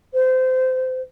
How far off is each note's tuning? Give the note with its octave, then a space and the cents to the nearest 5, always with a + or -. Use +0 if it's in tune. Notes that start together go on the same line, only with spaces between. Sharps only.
C5 -25